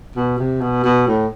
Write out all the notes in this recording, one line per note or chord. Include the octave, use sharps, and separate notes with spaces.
B2
C3
B2
B2
A2